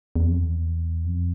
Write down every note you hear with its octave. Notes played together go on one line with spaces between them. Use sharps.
E2
F2
E2
F2